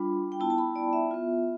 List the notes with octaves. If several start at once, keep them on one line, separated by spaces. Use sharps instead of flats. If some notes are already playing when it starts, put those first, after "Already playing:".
Already playing: G3 D4 F4 B5
G5
B3 E4 A5
A5
B5
D5
E5
B3 F4